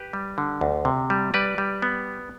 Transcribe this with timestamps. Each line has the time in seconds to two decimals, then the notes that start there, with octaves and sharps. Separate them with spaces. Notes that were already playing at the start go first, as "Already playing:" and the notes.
Already playing: G4 B4
0.13 G3
0.38 D3
0.61 D2
0.85 C3
1.10 G3
1.34 G3 B4 D5
1.58 G3
1.82 B3